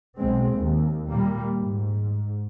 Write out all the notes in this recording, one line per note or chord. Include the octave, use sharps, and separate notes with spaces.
B1 G#3 C4
D#2
A#2 G3 A#3
G#2